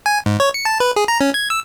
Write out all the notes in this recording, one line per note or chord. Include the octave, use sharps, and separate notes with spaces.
G#5
G#2
C#5
C#7
A5
B4
G#4
A#5
C#4
G#6
E6